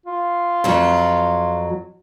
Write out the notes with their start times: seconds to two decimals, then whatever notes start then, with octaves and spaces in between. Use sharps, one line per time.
0.06 F4
0.64 F2 F#3